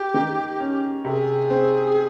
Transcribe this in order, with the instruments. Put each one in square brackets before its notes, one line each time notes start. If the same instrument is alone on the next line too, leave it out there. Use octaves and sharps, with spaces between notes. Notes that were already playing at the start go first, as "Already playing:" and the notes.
Already playing: [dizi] G4
[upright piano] D#3
C#4
[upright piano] C3 [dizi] A#4
[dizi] G#4
[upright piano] C4